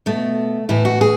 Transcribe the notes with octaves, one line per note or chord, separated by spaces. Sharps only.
B2 A3
A2 E3 E4
F#4
G#4